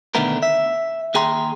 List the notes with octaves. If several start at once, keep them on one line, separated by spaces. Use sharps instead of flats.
B2 D3 D#3 A3 B3 A#4
E5
D#2 G#4 G5 A#5 C6